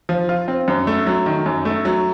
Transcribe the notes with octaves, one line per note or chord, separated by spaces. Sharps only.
F3
F4
C4
F#2
A3
F#3
D#3
F#2
A3
F#3